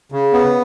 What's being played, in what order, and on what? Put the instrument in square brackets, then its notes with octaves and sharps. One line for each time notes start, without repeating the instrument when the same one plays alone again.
[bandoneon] C#3
B3